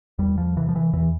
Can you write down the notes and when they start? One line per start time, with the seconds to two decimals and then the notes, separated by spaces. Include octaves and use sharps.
0.19 E2 G3
0.38 F3
0.57 C3 E3
0.69 F3
0.76 E3
0.93 E2 E3